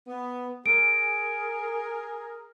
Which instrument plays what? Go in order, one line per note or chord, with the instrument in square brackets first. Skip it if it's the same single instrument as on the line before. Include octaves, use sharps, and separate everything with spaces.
[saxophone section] B3
[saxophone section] G#4 A#4 [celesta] D7